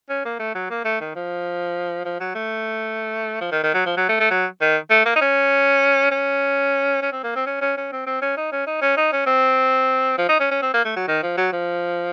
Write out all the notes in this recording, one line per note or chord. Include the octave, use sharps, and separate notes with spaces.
C#4
A#3
A3
F#3
A#3
A3
D#3
F3
F3
F#3
A3
F3
D#3
D#3
F#3
F3
F#3
A3
A3
F#3
D#3
A3
A#3
D#4
C#4
C#4
C#4
C4
A#3
C4
C#4
C#4
C#4
C4
C4
C#4
D#4
C#4
D#4
C#4
D#4
C#4
C4
F3
D#4
C#4
C#4
C4
A#3
A3
F#3
D#3
F3
F#3
F3